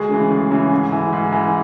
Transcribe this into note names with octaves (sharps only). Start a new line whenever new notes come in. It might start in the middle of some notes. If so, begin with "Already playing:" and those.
Already playing: D2 G#3 G#4
C#3 E3
D2
C#3 E3
G#2
E3
G#2
E3